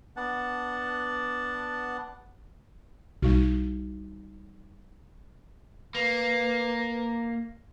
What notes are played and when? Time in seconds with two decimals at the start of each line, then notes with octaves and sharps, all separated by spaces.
0.17 B3 D4 F#5 A5
3.22 B1 G3 D#4 F#4
5.95 A#3 B4